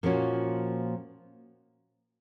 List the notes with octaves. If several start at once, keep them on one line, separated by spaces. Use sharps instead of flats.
A#2 F3 A#3 C#4 F#4